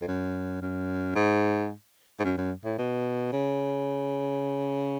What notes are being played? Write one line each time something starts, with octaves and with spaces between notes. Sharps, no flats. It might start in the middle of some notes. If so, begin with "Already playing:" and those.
F2
F#2
F#2
G#2
G#2
F#2
F#2
A2
B2
C#3